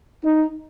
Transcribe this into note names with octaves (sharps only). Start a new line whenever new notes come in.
D#4